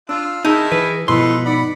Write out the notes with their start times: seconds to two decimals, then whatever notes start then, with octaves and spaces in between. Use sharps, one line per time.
0.09 D4 F4 E6
0.45 D#3 D#4 E4 G#4 A5
0.72 E3 B4
1.08 G#2 B2 F3 D#4 E4 A4 B4 C6
1.46 D#4 D5 F#5 B5